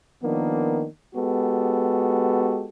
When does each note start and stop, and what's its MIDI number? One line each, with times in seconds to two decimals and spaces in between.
0.22 0.84 51
0.22 0.84 53
0.22 0.84 58
0.22 0.84 59
0.22 0.84 62
1.14 2.68 56
1.14 2.68 59
1.14 2.68 66
1.14 2.68 67
1.14 2.68 69